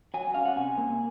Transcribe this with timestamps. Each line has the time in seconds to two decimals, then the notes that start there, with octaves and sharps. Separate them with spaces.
0.14 F#3 G#5
0.34 C#4 F5
0.45 F#5
0.56 C3 G#5
0.78 A#3